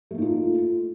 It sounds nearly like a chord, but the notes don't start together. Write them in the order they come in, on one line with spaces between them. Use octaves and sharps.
A3 A#3 D#4 F4